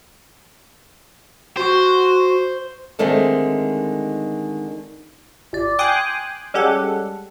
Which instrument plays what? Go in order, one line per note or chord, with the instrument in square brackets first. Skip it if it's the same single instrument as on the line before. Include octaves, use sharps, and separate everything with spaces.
[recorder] F#4 [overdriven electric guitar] C5
[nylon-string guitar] D3 D#3 G#3 A3 C4 D#4
[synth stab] G1 D5
G5 G#5 C6 D6 D#6 F#6
G3 G#3 C#4 G4 A4 F#5